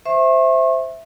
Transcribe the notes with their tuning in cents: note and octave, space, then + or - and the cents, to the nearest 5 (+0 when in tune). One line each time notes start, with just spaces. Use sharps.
C5 +0 E5 +0 C#6 -40